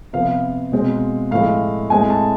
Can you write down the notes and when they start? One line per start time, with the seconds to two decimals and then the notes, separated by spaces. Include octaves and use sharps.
0.13 C3 F3 B3 F5
0.72 B2 G#3 C4
1.31 A2 F3 G#3 F5
1.90 A2 G#3 C4 G#5
2.10 A5